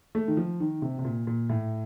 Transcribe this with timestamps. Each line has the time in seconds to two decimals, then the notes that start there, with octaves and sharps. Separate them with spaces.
0.15 A3
0.28 D#3
0.37 F3
0.60 D#3
0.82 C3
0.99 C3
1.05 A#2
1.27 A#2
1.49 A2